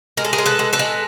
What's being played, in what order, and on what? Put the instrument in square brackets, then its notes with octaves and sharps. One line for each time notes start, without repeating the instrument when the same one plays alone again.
[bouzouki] G#3 A#4
A4
G#4 A#4
G#3
A4 B4
G#3
A4 B4
G#3